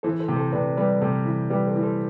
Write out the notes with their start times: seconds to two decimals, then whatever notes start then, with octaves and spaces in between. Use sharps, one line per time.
0.03 E3 A4 C5
0.20 A4 C5
0.28 C3
0.36 A4 C5
0.52 C3 B4 D5
0.77 G3 B4 D5
1.01 C3 A4 C5
1.25 E3
1.50 G3 G4 B4
1.67 A4 C5
1.76 E3
1.83 A4 C5